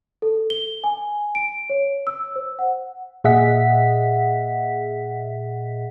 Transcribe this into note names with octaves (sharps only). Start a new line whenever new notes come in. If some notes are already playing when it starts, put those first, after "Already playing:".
A4
G7
G#5
D7
C#5
E6
C5
F#5
A#2 G#4 D#5 E5 F#5 B6